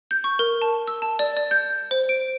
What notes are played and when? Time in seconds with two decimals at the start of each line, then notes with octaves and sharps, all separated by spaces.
0.11 G6
0.24 C#6
0.39 A#4
0.62 A5
0.88 E6
1.02 A5
1.19 D5
1.37 D5
1.51 G6
1.91 C5
2.09 D7